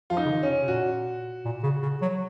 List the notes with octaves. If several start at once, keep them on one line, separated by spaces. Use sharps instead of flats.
F3 F4
D#4
C#3
D#3
C#4
C3
C3
A#2 F#4
A#2
C#3
C#3
F#3